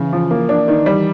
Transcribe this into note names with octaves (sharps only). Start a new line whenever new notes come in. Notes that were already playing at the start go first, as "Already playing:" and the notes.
Already playing: C#3 E3
F3
A#3
D4
D#3
G3